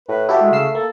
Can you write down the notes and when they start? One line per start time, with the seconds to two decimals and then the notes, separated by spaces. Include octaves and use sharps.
0.09 A2 B4
0.29 E4 F#4 G4 A4
0.41 G#3 A3
0.52 C#3 F5 E6 C7
0.75 A#3 A4